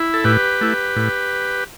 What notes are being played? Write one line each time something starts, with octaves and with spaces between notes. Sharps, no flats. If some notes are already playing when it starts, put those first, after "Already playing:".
Already playing: E4
A4
A2 G4 B4
A3 E4
A2